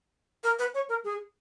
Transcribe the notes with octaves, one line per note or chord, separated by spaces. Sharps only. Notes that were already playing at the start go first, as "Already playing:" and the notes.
A#4
B4
C#5
A#4
G#4